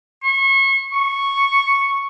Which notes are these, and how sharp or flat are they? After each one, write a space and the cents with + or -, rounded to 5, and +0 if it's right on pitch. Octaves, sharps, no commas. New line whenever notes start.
C#6 -35
C#6 -5